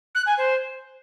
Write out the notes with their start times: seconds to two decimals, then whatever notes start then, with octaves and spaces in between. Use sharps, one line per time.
0.15 F#6
0.26 G#5
0.38 C5